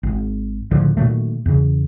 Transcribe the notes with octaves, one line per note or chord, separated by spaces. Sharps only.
G#1
C#2 A2 D3 F3
A#2 D#3 F#3 A3
E2 C#3